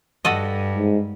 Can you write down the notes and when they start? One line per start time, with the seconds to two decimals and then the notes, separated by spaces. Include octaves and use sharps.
0.25 G2 F#4 A4 D#5
0.76 G#2